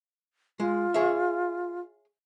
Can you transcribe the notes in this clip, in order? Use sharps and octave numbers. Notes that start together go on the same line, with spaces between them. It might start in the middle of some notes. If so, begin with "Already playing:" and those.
G#3 F4
G#4 C#5 E5